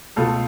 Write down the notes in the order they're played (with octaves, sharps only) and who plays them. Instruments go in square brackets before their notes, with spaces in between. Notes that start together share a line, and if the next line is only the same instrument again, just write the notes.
[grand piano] C#2 B2 A3 F4 A4